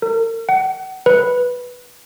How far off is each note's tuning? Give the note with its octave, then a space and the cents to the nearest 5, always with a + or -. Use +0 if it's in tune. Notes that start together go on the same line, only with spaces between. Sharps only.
A#4 -40
F#5 +35
B4 -5